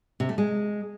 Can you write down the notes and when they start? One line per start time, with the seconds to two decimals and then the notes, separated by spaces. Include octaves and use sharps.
0.20 C3
0.29 A3
0.38 G#3